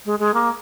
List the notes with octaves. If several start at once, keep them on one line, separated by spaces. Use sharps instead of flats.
G#3
G#3
A#3